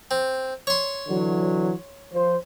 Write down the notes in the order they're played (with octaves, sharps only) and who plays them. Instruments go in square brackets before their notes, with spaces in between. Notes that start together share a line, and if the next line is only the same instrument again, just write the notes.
[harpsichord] C4
C#5 C6
[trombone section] D3 E3 F#3
F3 C5